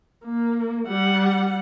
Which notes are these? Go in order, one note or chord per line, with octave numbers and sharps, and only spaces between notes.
A#3
G3 F#5